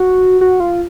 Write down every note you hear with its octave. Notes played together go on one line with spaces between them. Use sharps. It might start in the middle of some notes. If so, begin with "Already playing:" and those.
Already playing: F#4
F#4
F4